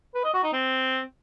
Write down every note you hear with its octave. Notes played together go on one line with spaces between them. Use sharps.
B4
D#5
F#4
D#4
C4